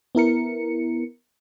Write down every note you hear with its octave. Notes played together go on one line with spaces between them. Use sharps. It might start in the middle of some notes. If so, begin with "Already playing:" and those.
B3 E4 A#4 C#7